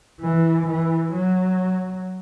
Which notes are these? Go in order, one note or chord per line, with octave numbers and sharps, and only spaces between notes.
E3
E3
F#3